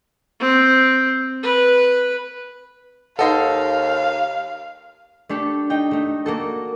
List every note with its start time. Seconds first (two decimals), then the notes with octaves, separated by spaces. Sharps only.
0.40 C4
1.43 B4
3.19 D#2 D#4 A4 B4 D#5 F5 F#5
5.29 A3 D4 G4 A4
5.70 D#4 G5
5.91 A3 D#4
6.26 A#3 F#4 A4